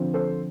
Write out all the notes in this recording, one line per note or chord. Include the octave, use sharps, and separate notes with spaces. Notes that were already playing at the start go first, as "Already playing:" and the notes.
Already playing: D3 F3 C4
A4 C5